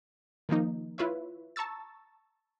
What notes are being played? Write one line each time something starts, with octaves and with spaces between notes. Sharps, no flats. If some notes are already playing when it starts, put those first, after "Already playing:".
D#3 F3 A#3 D#4
E4 F4 B4 C#5 E5
A5 A#5 C#6 E6 A6